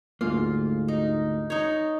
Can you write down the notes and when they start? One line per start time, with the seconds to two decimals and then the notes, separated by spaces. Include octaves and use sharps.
0.21 D2 G#2 A#3 F4
0.88 D#4
1.50 D#4 C#5